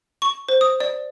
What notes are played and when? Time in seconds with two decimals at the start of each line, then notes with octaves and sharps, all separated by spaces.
0.22 C#6
0.49 C5
0.61 D#6
0.80 D5